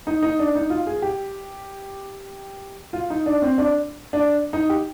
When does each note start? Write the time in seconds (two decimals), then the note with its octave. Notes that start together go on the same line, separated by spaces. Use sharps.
0.07 D#4
0.22 D#4
0.39 D4
0.55 D#4
0.70 F4
0.87 G#4
1.02 G4
2.93 F4
3.10 D#4
3.26 D4
3.42 C4
3.58 D4
4.13 D4
4.53 D#4
4.70 G4